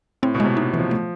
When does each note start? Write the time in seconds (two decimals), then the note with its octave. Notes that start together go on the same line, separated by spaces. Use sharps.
0.23 A2 C4
0.35 B2
0.40 C3 G#3
0.57 D#4
0.74 E3
0.79 F3
0.91 A3